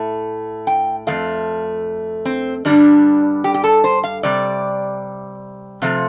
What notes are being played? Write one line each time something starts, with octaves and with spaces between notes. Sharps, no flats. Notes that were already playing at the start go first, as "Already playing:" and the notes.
Already playing: A2 A3
G5
F2 F3 A3 F5
C4
G2 D3 G3 D4
G4
G4
A4
C5
F5
C3 G3 D5
C3 F3 A3 F5